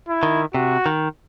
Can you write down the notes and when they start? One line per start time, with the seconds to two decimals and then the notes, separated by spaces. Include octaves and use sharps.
0.08 E4
0.23 D#3
0.54 C3 F#4
0.86 D#3